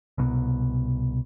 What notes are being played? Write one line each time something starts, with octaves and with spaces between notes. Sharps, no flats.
C2 B2